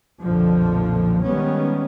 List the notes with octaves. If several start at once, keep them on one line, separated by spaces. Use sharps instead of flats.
B1 F2 A#2 D3 F3
D#3 G3 G#3 B3 C#4